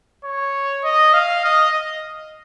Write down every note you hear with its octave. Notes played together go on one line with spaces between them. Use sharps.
C#5
D#5
F5
D#5